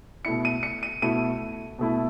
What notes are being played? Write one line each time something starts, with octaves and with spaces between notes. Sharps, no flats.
B2 A3 E4 C#7
D#7
C#7
D#7
B2 A3 E4 D#7
B2 A3 E4